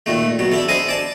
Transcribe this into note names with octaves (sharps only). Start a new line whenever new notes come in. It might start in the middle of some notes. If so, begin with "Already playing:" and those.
A#2 D#3 A3
B2 F#3
D4 E4 A4
D4 A4 C5 D#5 G#5
D5 A5